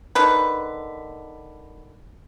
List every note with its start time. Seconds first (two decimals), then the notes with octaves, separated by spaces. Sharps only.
0.15 D3 D#3 B4